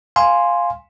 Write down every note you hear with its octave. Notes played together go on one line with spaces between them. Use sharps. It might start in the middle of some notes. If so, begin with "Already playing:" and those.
F5 G#5 C6